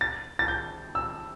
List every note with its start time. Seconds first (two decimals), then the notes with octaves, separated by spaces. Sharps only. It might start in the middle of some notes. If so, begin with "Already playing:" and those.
0.01 A6
0.39 A6
0.48 G6
0.95 E6